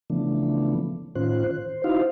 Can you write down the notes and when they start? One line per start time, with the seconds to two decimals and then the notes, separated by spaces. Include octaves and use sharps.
0.10 C#3 E3 F3 A3 B3 D4
1.15 A2 D#3 C#4 F4 C5 F#6
1.51 C5
1.84 D#4 E4 F#4 C5 F5